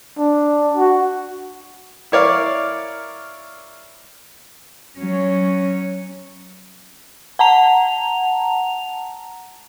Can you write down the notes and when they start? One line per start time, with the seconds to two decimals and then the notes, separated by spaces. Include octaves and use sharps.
0.18 D4
0.77 F#4
2.12 E4 A#4 C#5 D5 F5
4.98 F#3 C#4
7.39 F#5 A5 A#5 F7